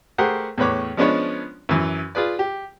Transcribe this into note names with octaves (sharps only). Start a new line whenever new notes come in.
A3 G4 G#4 A#4 C5 F#5
E2 A2 B4 C#5 D6
F3 G#3 B3 C#4 D4 C#5
F#2 E3
F4 G#4 B4 D5
G4